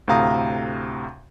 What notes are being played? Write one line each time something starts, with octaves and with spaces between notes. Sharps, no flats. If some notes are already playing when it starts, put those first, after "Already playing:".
D2 A2 C3 F5 A#5 D#6